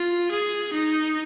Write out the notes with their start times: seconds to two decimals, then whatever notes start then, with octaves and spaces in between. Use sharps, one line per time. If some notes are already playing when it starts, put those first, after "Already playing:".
Already playing: F4
0.31 G#4
0.73 D#4